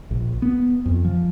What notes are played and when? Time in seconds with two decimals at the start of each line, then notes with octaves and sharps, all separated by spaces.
0.11 A#1
0.42 B3
0.86 F2
1.05 F3